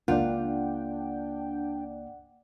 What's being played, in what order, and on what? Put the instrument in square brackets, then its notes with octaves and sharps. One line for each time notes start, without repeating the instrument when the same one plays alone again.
[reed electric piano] C#2 A#3 [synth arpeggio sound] D4 G5 [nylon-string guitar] F4 [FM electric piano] D5 F#5